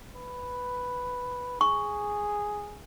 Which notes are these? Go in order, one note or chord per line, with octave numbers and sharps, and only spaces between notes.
B4
G#4 C#6